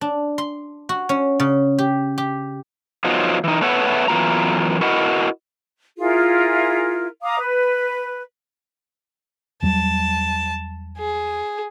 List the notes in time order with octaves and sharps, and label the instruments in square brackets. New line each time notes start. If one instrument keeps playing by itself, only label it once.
[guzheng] D4
C6
F#4
C#4
C#3
G4
G4
[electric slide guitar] F3 F#3 B3 D#4 F4 F#4
E3 D#4
A3 B3 B4 C#5 E5 F#5
F#2 E3 B3 F4 F#4 A#5
E4 F#4 A#4 B4 D#5 F#5
[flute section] E4 F4 G#4 A#4
F5 A#5 D6 D#6
B4
[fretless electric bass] E2 F#3 G3 [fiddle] A5
[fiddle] G#4